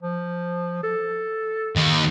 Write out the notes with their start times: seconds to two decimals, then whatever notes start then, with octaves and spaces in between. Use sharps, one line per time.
0.03 F3
0.83 A4
1.76 D#2 D#3